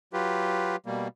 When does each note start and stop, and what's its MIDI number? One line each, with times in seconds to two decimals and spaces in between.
0.13 0.76 54
0.13 0.76 65
0.13 0.76 67
0.13 0.76 71
0.86 1.08 47
0.86 1.08 55
0.86 1.08 58